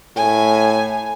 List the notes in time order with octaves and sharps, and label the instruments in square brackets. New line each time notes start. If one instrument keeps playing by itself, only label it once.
[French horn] A2 [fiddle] G#5